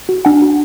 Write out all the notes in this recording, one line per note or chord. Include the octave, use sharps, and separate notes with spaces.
F#4
D4 F#5 G#5
F#4